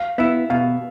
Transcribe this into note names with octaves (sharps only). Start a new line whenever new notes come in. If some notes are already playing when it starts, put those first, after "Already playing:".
Already playing: F5
B3 E4 E5
B2 F5